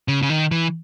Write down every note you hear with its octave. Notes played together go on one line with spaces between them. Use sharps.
C#3
C#3
D#3
E3